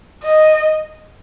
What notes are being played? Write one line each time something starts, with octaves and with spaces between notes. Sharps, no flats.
D#5